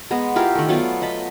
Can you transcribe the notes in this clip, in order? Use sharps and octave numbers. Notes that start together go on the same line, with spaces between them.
G#3 B3 A#5
E4 F4 G4 A#4
D#3 A3
F#3 B3 F4 D5
D#5 A5 B5